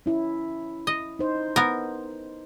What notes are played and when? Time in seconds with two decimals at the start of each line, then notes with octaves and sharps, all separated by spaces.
0.06 C#4 E4
0.87 D#5
1.19 D#4 C5
1.56 B3 A#4